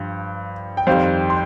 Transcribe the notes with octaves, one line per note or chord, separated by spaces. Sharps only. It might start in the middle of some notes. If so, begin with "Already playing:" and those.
Already playing: G2 F3
G5
F2 D#3 G3 C4 C5 F5
C6